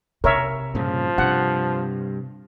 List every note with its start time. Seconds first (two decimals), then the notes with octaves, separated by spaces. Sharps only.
0.24 C3 A#4 C#5 E5
0.75 G2 A#2 C#3 F3
1.18 G2 C3 F#5